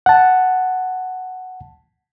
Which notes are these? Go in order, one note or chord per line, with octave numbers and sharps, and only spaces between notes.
F#5 A5